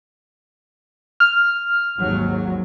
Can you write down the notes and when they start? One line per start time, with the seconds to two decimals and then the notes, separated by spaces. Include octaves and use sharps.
1.20 F6
1.98 G#1 D#2 F#3